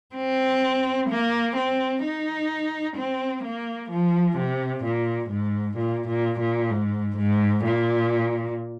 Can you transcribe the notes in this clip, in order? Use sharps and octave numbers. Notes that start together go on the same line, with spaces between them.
C4
A#3
C4
D#4
C4
A#3
F3
C3
A#2
G#2
A#2
A#2
A#2
G#2
G#2
A#2